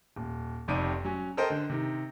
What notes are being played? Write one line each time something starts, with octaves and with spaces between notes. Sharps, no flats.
D#1
F1 F2 C3 D#4 D5 D#7
F#3 C#4
A4 A#4 C5 D#5 G5
D3
C3 D#3